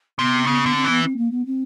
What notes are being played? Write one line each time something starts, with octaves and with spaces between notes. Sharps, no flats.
C3 B3
C#3 B3
D3 B3
C4
E3 B3
C4
A#3
B3
C4